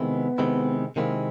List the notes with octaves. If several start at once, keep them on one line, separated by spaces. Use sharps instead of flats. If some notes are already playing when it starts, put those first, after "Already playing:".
Already playing: C3 D#3 G#3 B3 C4 E4
C3 D#3 G#3 C4 E4
C3 D#3 G#3 A#3 C4 E4